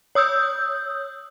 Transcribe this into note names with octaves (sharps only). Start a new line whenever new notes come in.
C#5 D#6 E6 G6